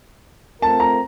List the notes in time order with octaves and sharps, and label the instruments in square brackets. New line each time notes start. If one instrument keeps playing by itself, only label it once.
[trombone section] A3 C4 F4 A#4 [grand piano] A5
[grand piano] A#5